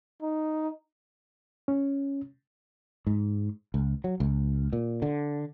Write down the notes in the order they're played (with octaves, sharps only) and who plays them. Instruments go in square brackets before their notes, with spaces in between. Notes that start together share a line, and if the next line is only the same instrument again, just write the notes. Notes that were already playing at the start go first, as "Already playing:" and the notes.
[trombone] D#4
[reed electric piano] C#4
[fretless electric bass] G#2
C#2
F#3
C#2
A#2
D3